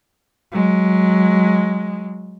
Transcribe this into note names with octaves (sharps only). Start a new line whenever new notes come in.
F#3 G#3